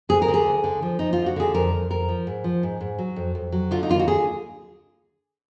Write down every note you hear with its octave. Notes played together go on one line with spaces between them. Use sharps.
D2 G#4
A#4
D3
G#4
D2
D3
F3
F3 D#4
D3 F4
F#4
D3 G#4
F2 A#4
F2
F2 A#4
F3
G#2
F3
G#2
G#2
F#3
F2
F2
F#3
D3 F4
D#4
D#2 F4
F#4
D3 G#4